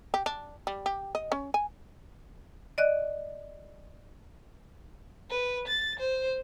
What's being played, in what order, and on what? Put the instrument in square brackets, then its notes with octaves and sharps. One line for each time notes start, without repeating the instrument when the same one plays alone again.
[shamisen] G4
D4
G3
G4
D#5
C#4
G#5
[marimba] D5 D#5 F#6
[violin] B4
A6
C5